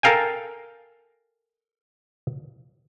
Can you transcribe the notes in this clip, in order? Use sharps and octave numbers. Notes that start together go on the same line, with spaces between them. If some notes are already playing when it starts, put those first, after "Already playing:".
A4 A#4 F5 G5 G#5